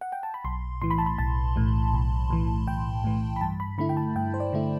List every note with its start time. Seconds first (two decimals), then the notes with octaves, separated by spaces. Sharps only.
0.01 F#5
0.12 G5
0.23 A5
0.34 B5
0.45 B1 C6
0.82 A2 E3 C6
0.90 B5
0.98 A5
1.06 B5
1.18 B1 A5
1.56 A2 E3
1.93 B1
2.30 A2 E3
2.67 B1 G5
3.04 A2 E3
3.36 B5
3.41 G2 A5
3.60 B5
3.78 D3 A3 E4 B5
3.89 G5
3.97 A5
4.15 G2 G5
4.34 C5
4.40 D5
4.53 D3 A3 E4